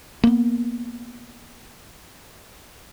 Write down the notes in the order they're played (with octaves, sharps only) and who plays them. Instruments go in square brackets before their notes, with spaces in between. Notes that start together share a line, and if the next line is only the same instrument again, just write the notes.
[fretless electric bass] A#3 B3